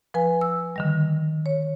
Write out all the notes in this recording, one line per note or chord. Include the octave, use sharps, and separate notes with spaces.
F3 B4 G#5
E6
D3 D#3 G3
C#5